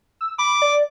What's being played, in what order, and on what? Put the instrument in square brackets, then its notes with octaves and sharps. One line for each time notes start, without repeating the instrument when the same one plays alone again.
[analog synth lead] E6
[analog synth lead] B5 [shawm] D6
[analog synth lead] D5